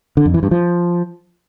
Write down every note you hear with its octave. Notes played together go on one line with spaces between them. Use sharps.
D3
F2
E3
G2
F3